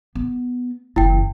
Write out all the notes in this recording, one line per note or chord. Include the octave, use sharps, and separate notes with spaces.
B3
F#1 E3 E4 G5